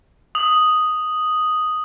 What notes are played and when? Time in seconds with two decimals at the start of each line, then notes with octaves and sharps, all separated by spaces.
0.35 D#6 F#7